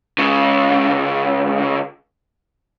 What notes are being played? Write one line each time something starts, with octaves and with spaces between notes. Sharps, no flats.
C#2 C#3